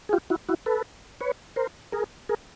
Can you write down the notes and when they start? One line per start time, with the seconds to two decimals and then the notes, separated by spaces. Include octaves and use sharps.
0.09 G#4
0.13 F4 G4
0.30 E4 F#4
0.49 E4 F#4
0.66 A4 B4
1.21 B4 C#5
1.56 A#4 C5
1.92 G#4 A#4
2.29 G#4 A#4